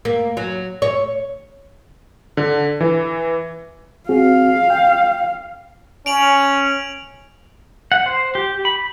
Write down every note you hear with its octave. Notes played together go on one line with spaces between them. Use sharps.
A#3
F#3
C#5
D3
E3
C4 F#4 G#4 F5
G5
C#4 D7 F7 F#7
F#5
C5
G4
B5